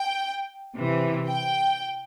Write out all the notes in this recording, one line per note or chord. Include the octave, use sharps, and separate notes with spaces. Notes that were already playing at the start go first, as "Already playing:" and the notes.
Already playing: G5
C3 E3
G5